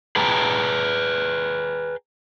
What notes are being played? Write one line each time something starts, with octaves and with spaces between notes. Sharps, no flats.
G#4 B4 G5 A5 A#5